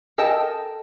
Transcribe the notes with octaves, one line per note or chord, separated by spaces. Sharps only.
A4 A#4 D#5 G5 A5